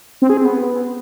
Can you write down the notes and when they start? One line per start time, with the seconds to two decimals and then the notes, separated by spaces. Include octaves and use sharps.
0.22 C4
0.29 G#4
0.37 C4
0.45 B3